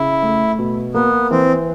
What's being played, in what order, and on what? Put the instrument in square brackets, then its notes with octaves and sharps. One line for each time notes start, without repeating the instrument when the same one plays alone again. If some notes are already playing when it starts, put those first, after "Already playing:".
Already playing: [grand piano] C#3 [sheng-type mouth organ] E4
[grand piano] A3
B2
[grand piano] A#3 [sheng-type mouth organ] B3
[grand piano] E3 [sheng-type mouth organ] C4